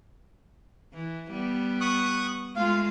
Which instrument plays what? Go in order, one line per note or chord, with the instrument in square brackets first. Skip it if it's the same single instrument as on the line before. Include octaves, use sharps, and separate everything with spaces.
[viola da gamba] E3
G3 B3
[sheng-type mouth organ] C#6 D#6 F#6
[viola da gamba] G#3 A3 F4 [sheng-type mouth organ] F5